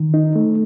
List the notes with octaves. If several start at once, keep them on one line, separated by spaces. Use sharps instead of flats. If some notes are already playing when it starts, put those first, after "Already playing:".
Already playing: D#3
D#4
A3